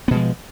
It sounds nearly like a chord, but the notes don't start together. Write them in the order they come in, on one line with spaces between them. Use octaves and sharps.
B3 B2 G#3 F3